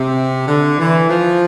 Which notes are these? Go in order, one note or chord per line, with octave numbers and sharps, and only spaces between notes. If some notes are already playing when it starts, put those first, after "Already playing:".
Already playing: C3
D3
E3
F3